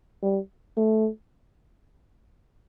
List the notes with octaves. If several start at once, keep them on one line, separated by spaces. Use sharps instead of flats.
G3
A3